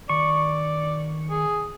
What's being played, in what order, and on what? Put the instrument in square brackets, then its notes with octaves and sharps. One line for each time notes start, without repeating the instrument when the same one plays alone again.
[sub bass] D#3 [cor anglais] D5 [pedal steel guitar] C#6
[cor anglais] G#4